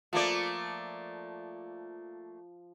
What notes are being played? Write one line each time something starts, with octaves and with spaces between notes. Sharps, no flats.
F3 A3 A#3 D5